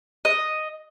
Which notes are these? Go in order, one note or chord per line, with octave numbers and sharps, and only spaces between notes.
D#5